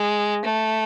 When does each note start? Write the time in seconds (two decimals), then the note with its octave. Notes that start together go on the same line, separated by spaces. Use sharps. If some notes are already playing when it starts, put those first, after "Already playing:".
Already playing: G#3
0.45 A3